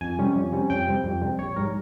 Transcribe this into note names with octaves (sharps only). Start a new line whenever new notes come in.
F2 G#5
C3 G3 C#4
F2
C3 G3 C#4
F2 G5
C3 G3 C4
F2
C3 G3 C4
A#1 C#5
G#2 G3 A#4